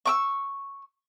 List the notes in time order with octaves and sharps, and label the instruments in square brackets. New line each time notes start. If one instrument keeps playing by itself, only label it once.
[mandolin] C#6 D6 E6